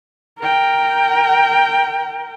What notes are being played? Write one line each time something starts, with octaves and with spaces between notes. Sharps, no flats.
A#4 G5